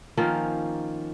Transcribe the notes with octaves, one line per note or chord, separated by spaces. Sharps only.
D#3 F3 A#3 C#4